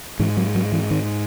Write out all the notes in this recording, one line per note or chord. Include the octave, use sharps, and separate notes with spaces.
G#2 E3
F#3
F#3
E3
D#3